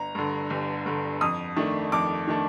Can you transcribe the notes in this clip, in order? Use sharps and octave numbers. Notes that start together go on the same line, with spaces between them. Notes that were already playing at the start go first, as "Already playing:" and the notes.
Already playing: G1 A#5
G2 D3
G1
G2 D3
F2 D#6
D#3 A3 D4
F2 D6
D#3 A3 D4